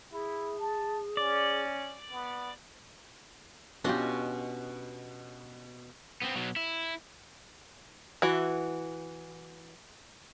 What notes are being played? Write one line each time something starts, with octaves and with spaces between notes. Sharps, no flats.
E4 G#4
A5
C#4 D5
B3
B2 C#4 D4 F4 G4 D#5
B3 C4
B2 F#3
E4
E3 F#4